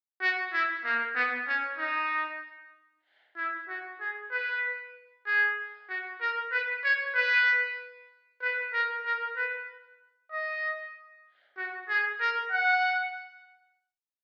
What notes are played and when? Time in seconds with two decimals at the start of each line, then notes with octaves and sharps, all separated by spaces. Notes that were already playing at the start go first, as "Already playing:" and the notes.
0.21 F#4
0.53 E4
0.85 A#3
1.15 B3
1.47 C#4
1.78 D#4
3.37 E4
3.69 F#4
4.01 G#4
4.31 B4
5.26 G#4
5.89 F#4
6.21 A#4
6.52 B4
6.84 C#5
7.15 B4
8.42 B4
8.73 A#4
9.05 A#4
9.37 B4
10.32 D#5
11.57 F#4
11.89 G#4
12.21 A#4
12.52 F#5